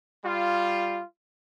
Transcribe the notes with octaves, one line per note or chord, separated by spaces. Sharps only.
G3 F4